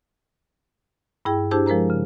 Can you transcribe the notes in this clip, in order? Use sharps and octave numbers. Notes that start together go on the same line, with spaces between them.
G2 E4 G#4 G5
D4 E4 G4 G#4 C5 A5
F3 G#3 A#4 C5 A#5
C#3